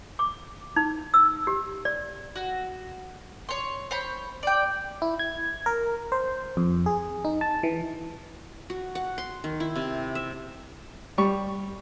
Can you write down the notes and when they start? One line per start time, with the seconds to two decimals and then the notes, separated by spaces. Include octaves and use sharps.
0.19 D6
0.76 D#4
1.14 E6
1.47 G4
1.85 D5
2.36 F#4
3.49 C#5 C6
3.91 C5 C#5 B5
4.43 D5 G5
5.02 E4
5.19 G#6
5.66 A#4
6.12 C5
6.57 F2
6.86 G#4
7.25 D#4
7.41 A5
7.63 E3
8.70 F#4
8.95 F#5
9.18 C6
9.44 D#3
9.60 E4
9.76 C3
10.15 E5
11.18 G3 C#6